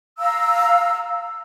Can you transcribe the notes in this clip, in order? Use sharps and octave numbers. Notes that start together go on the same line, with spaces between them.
F5 A#5 E6